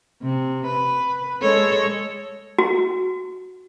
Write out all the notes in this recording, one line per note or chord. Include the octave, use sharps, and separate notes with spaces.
C3
B4
G#3 A4 C#5
F#4